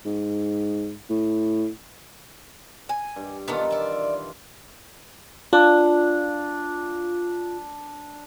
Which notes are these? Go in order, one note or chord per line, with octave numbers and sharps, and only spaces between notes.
G#2
A2
G#5
G2
D#3 E3 B3 D4 F4 A4
D5 E5
D4 F4